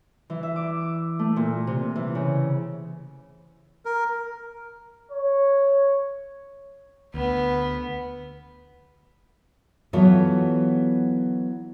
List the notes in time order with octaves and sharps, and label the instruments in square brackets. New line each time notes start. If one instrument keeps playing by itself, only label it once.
[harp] E3
E5
D6
D6
A3
A#2
C3
E3
C#3
[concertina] A#4
[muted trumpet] C#5
[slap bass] D2 [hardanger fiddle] B3
[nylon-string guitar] E3 F#3 B3 F4 A4 C#5